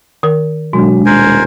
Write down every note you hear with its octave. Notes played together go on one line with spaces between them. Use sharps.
D#3 A#4
B2 F#3 G#3 D4
D#1 A#4 C5 G#5